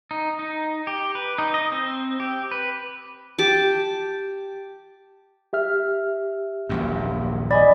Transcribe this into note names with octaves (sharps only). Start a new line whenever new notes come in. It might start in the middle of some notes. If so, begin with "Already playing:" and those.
D#4
D#4
G4
B4
D#4
D#5
C4
G4
B4
G4 A5 D6
G4 E5 F6
D#1 A#1 F#2
D5 D#5 G#5 B5